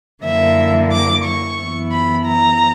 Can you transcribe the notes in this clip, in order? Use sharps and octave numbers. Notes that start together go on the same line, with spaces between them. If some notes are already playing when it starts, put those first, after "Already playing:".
F#2 D3 A#3 E4 E5
D6
C#6
F#2 E3 B3 E4
B5
A#5